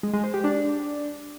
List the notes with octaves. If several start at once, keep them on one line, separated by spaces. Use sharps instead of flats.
G#3
G#3
C5
G4
D4